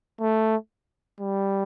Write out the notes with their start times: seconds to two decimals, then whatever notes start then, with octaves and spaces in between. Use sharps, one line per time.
0.21 A3
1.20 G3